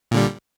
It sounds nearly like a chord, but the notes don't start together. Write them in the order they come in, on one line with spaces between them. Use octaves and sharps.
A#2 D3 G3